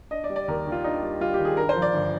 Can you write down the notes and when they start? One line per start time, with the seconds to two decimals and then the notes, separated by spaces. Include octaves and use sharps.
0.11 D4 D#5
0.24 D5
0.30 G3
0.36 D5
0.48 D#2 A#4
0.66 D#3
0.72 F4
0.84 D4 D#4
1.03 G3
1.21 G3 F4
1.34 G4
1.40 D#3
1.45 G#4
1.57 G2 A#4
1.69 C5
1.76 F3
1.82 D5
1.93 G1